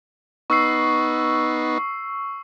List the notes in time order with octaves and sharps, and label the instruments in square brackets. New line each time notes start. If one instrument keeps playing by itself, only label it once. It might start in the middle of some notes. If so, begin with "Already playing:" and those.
[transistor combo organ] B3 D#4 [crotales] C#6 E6 C7